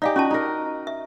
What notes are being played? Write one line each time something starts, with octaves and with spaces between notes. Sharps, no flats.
D#4 G4 D5 F5 G#5
C#4 F4 F#4 A5
D#4 A#4
E5